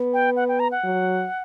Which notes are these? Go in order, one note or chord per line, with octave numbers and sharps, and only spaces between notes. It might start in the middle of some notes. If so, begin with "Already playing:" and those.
Already playing: B3
G5
F#5
G5
A#5
F#5
F#3